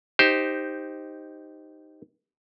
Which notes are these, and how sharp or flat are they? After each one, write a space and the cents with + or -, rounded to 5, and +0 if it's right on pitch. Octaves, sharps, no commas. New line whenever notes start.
D#4 +0 G4 +0 C5 +0